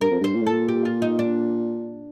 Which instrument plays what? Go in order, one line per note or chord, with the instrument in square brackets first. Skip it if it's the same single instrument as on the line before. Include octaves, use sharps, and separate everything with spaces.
[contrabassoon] G2 [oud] A#4
[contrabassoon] F2
[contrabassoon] G2 [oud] C5
[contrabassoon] A#2
A2
[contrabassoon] A#2 [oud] A4
[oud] G4
F4
D#4
D4